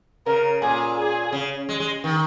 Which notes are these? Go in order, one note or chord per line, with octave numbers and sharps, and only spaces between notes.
C#3 A#4
A#2 G#4
G#4
C#3
G#3
G#3
D#3